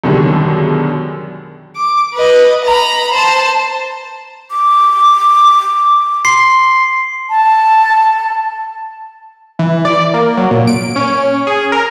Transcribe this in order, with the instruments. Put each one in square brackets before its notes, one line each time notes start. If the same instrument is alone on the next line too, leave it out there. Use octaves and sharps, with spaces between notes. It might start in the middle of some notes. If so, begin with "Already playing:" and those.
[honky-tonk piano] F#2 B2 D3 D#3 G3 G#3
[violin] D6
B4 D#5
A#5 B5
C5 A5
[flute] D6
[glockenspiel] C6 C7
[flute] A5
[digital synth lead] E3
D5
A#3
F#3
A#2
D7
C#4
G#4
A#4